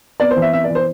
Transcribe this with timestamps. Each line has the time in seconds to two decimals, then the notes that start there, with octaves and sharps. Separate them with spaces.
0.20 B3 D5
0.31 C5
0.36 E3
0.42 E5
0.53 B3 E5
0.64 D5
0.70 E3
0.75 C5